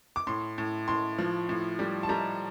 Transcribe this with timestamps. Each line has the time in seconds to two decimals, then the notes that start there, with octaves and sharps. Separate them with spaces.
0.16 D6
0.27 A2 C6
0.58 A2
0.88 A2 C6
1.19 F3
1.49 A2
1.79 G3
2.03 A5
2.09 G3 A#5